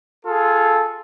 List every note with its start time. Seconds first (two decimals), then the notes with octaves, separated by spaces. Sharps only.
0.26 F4 G#4 A4